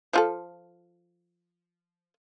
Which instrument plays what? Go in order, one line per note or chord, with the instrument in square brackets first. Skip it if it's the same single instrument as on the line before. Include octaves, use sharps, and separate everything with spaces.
[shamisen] F3 F4 A4